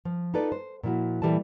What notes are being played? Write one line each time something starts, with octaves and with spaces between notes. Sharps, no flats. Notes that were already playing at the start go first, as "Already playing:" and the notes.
F3
D#4 F4 A4 B4 D5
C5
A#2 F3 E4 F#4
A#2 E3 G3 A4 D5 A5